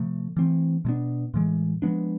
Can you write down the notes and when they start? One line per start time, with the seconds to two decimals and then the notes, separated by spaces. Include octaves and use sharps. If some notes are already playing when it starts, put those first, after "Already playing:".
Already playing: C3 F3 A3
0.37 E3 A3 C4
0.85 B2 G#3 B3 D4
1.34 A2 E3 G#3
1.82 F3 G#3 B3 D4